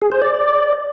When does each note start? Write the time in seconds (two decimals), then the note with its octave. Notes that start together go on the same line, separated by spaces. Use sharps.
0.02 G#4
0.12 C5
0.22 D5